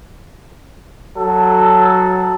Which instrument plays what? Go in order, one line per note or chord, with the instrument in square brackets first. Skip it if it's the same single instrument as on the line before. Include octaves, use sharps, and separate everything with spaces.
[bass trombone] F#3 [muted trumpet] A4